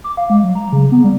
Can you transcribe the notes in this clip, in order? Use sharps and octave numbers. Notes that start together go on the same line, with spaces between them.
D6
F5
G#3
F#3
A#5
C#3
B3
G3